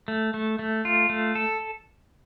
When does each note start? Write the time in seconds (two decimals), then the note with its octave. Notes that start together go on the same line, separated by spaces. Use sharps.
0.08 A3
0.34 A3
0.59 A3
0.85 F4
1.09 A3
1.35 A4